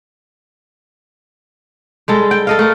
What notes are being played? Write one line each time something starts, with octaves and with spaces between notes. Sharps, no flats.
G3 G#3 A4
G5
A4 D#5 F5
A3 A#4